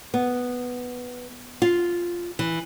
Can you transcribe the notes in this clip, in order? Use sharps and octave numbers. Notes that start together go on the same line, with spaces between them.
B3
F4
E3